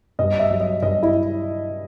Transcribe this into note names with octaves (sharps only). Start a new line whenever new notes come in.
G2 D#5
E5
F#3
D#5
G2 D#5
E4